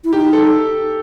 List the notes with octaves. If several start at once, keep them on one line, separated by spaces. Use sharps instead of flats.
E4
D#4 G4
A4